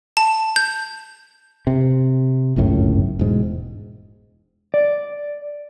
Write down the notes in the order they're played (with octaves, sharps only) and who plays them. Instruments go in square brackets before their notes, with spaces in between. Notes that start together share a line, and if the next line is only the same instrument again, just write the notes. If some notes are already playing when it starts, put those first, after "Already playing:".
[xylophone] A5
G6
[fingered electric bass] C3
G1 C#2 F#2 A2
E1 G#2
[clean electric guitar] D5